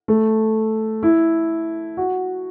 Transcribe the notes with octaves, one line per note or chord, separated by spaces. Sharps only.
A3
E4
F#4